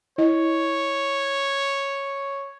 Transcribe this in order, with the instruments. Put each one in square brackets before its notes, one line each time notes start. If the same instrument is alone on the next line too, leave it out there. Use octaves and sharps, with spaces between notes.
[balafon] E4 D#5 [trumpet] C#5